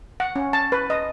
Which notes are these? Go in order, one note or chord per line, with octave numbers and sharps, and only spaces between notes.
F#5
C#4
A5
B4
D#5